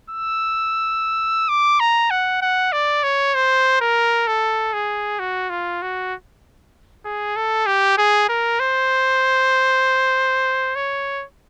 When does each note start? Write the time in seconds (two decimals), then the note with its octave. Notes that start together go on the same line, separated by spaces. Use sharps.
0.10 E6
1.49 D6
1.80 A#5
2.10 F#5
2.42 F#5
2.72 D5
3.03 C#5
3.34 C5
3.80 A#4
4.27 A4
4.73 G#4
5.19 F#4
5.50 F4
5.82 F#4
7.05 G#4
7.36 A4
7.66 G4
7.97 G#4
8.29 A#4
8.60 C5
10.75 C#5